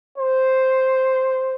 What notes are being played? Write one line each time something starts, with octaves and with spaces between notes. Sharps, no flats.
C5